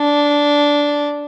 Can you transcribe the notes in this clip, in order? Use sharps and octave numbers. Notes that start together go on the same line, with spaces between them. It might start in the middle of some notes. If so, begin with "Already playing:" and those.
Already playing: D4